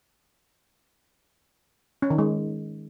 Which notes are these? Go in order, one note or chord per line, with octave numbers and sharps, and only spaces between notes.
C#4
D#3
G#3